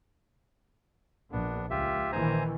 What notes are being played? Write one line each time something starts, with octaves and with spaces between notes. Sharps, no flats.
A#1 B3 D4
C#2 F4 G4 E5
A#1 D#3 E3 C5 G#5 A#5